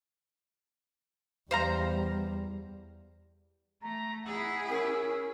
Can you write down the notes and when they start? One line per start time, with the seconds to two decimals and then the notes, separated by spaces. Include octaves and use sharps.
1.51 E2 G3 C5 F5 A#5
3.82 A3 A#5
4.26 E4 G#4 F#5 E6
4.69 C#4 A#4